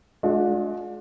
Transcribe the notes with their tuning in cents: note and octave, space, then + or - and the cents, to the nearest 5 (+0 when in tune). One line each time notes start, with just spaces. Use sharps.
G#3 +35 D4 +0 F4 +45